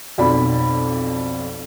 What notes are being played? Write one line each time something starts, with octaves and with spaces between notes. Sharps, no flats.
B1 F2 D5 B5